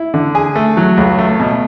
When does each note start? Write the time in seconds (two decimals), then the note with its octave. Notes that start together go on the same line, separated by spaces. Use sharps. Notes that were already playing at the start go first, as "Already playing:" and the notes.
Already playing: E4
0.14 D3
0.35 G#4
0.56 A3
0.77 F#3
0.97 C#2
1.19 A3
1.39 B2